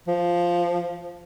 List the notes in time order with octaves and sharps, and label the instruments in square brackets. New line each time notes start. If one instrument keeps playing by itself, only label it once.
[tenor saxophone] F3